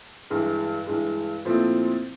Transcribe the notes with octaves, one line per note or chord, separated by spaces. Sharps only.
G2 E3 G#3
G2 E3 G#3
A#2 F3 A3 C4 E4